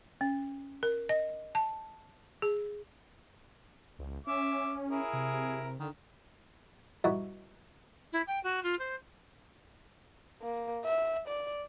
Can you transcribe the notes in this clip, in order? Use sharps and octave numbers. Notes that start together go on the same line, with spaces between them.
C#4
A#4
D#5
A5
G#4
C#2
C#4 E5 D6
E4 G#4 A#4
C3
D3 D#3
G2 G3 D#4 E4 F#4
E4
G5
F#4
F4
C5
A#3
E5
D5